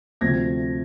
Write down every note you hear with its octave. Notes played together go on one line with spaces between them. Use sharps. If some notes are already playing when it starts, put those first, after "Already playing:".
D2 C3 F3 A3 C4 G#6 A#6